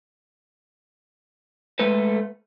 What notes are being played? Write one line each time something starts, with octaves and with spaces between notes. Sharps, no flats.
G#3 A3 A4 B4